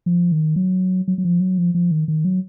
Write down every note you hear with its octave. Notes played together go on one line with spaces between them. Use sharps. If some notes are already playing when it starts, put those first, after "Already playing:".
F3
D#3
F#3
F#3
F#3
F3
F#3
F3
F3
D#3
D#3
F#3